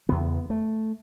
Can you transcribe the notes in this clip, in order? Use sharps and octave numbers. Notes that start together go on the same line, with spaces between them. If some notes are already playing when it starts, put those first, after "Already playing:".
E2 C#3 B3
A3